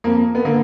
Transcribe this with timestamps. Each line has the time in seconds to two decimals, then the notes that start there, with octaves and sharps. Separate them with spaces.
0.04 F2 A#3
0.35 B3
0.45 D3 A#3